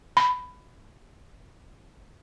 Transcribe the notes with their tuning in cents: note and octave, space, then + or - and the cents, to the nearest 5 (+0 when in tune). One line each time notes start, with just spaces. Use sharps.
B5 +15